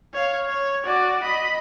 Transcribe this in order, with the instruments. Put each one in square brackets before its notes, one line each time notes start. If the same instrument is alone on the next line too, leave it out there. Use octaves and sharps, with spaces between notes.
[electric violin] C#5 F5
C#5
F#4 D5
D#5 B5